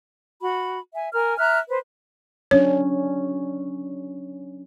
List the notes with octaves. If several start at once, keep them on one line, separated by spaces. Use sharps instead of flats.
F#4 B5
E5 G#5
A#4 G#5 F6
E5 A#5 F6 F#6
B4 C5
F#3 C#4 D4 C#5